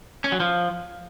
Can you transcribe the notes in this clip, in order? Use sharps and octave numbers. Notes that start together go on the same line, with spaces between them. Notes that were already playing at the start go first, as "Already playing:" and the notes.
C#4
F#3
F3